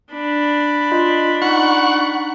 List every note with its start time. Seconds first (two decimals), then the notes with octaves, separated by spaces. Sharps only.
0.13 D4 B5
0.92 F4 D#5
1.42 D#4 F#5 C#6